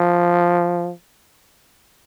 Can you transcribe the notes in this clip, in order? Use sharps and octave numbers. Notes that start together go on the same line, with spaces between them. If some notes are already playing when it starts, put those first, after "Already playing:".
Already playing: F3